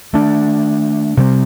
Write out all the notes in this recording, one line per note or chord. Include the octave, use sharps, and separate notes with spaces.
D#3 A3 D4
C3 G3 C4